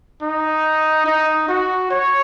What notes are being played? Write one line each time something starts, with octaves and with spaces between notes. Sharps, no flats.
D#4
D#4
F#4
C#5